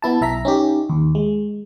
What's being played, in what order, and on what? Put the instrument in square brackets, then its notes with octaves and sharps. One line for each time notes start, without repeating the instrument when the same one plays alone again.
[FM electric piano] B3 E4 A5
B1 E5 A#5 B6
C#4 D#4 G4
D#2
G#3